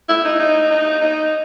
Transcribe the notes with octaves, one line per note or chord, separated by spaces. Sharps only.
E4
D#4
D#4
D#4
D#4